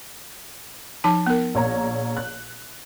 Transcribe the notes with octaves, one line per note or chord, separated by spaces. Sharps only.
F3 D#4 A5
B3 A#4
A#1 C#5 A#5
F#6